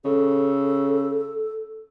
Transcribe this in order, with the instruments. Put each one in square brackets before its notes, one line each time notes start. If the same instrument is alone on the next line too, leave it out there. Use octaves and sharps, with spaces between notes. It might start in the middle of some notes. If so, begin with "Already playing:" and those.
[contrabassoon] C#3 [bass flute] A4